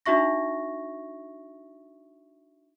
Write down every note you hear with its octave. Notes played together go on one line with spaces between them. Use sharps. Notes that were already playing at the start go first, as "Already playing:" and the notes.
D4 D#4 F#4 E5 C#6 A#6